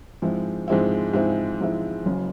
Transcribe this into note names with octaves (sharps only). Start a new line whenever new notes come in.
G#2 F3 G#3 C4 E4
G#2 F3 G#3 C4 E4
G#2 F3 G#3 C4 E4
G#2 F3 G#3 C4 E4
F#1 F#2 C#3